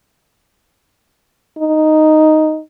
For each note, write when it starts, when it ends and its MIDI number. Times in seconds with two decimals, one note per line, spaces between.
1.59 2.60 63